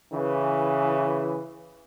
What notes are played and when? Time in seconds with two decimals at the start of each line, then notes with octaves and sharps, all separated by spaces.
0.12 C#3 E3